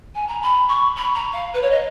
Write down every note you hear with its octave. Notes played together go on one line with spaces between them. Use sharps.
G#5
A#5
B5
C#6
B5
A#5
F5
B4
C#5
D#5